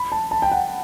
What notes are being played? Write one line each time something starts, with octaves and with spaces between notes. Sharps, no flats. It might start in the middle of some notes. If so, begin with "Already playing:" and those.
Already playing: B5
A5
A5
G5
F#5